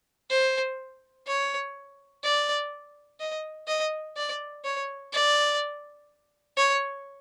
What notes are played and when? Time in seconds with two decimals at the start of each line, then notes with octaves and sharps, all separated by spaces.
0.30 C5
1.27 C#5
2.23 D5
3.20 D#5
3.68 D#5
4.16 D5
4.64 C#5
5.13 D5
6.57 C#5